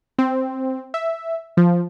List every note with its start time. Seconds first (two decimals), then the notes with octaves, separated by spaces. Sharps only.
0.19 C4
0.94 E5
1.57 F3